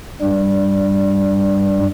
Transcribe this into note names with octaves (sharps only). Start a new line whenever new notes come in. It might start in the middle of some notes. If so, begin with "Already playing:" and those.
G2 G3